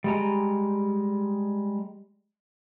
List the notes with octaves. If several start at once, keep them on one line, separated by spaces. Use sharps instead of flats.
G3 G#3 A#5